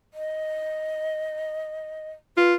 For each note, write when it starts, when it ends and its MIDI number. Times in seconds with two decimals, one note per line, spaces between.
0.14 2.10 75
2.37 2.55 65
2.37 2.53 71